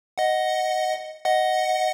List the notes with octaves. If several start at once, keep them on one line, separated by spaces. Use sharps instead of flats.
D#5 F#5
D#5 F#5